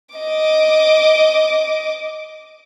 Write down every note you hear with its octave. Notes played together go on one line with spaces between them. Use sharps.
D#5 D6